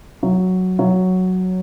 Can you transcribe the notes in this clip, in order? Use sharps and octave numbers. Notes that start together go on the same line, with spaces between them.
F#3
F#3